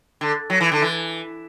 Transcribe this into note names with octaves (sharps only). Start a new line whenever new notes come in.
D3
F#3
E3
D3
E3